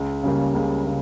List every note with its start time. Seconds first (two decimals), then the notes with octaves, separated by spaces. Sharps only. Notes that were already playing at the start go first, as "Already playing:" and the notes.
Already playing: C#2
0.23 C#3 G3 A#3
0.54 C#2
0.86 C#3